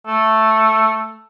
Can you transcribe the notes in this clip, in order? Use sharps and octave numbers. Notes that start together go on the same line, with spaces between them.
A3